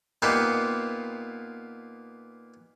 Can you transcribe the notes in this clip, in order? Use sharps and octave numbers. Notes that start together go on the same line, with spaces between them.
A#2 A#3 B3 D#4 G4 C6